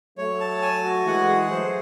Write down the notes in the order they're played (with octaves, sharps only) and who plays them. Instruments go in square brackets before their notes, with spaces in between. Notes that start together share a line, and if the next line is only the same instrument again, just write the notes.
[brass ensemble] F#3 A3 [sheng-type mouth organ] C#5
[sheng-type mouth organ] A5
G#5
F#4
[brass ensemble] E3 G#3 [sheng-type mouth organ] F#5
[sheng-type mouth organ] G#4
[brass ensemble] F#3 A3 [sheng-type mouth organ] C5